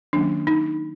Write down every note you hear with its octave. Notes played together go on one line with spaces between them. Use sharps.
D#3 F#3 A#3 C#4 D4
D#4